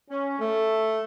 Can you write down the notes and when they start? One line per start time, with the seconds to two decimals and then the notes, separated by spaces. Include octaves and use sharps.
0.09 C#4
0.39 A3